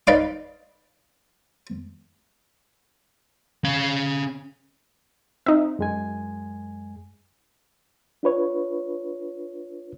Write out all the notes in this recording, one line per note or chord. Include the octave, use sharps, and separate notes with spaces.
D#4 B4 D5 F5 D6
C#4 F5
C4 D#4 E5
F#2 G#3 G#5
D4 F4 B4 C#5